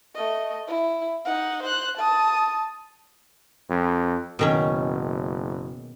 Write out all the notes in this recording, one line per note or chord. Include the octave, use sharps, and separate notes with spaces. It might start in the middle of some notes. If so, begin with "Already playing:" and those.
A3 D#5
E4
D#4 F#5
C5 F#6
A5 D#6
F2
F#1 B2 D#3 C#4